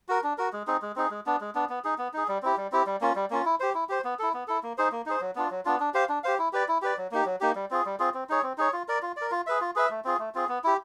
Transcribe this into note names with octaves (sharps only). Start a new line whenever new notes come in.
F#4 A#4
D4
F#4 A#4
G#3
C4 D#4 G#4
G#3
C4 D#4 G#4
G#3
B3 D4
G#3
B3 D4
B3
D#4 G#4
B3
D#4 G#4
G3
C4 E4 G4
G3
C4 E4 G4
G3
A#3 C#4 F4
G3
A#3 C#4 F4
E4
G4 C5
E4
G4 C5
B3
E4 A4
B3
E4 A4
A#3
D#4 G#4 C5
A#3
D#4 G#4 C5
F#3
B3 D4 F4
F#3
B3 D4 F4
D4
G4 C5 F5
D4
G4 C5 F5
E4
G4 B4 D5
E4
G4 B4 D5
F#3
A#3 D#4 G4
F#3
A#3 D#4 G4
G3
C4 F4 G#4
G3
C4 F4 G#4
C4
D#4 G#4 C#5
C4
D#4 G#4 C#5
F4
A#4 D5
F4
A#4 D5
F4
G#4 B4 E5
F4
G#4 B4 E5
A3
C4 F4 G#4
A3
C4 F4 G#4
B3
E4 G4